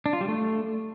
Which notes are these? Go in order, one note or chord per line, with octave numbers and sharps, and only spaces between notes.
D4
F4
G3
A3